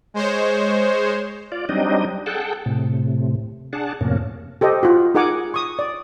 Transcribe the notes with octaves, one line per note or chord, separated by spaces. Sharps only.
G#3 C5 C#5
F4 D5
F#3 G3 C4 D4 D#4 D#5
G#4 A4 F#5 G5 A5
A2 C3
D4 G#4 F#5 A5
F2 A2 C3 A#3 C#4
G4 A4 C5 D#5
F4 F#4
D#4 G#4 A#4 F#5 G#5 D6
C#6 D#6
D5